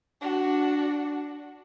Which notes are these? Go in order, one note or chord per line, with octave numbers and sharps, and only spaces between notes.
D4 F#4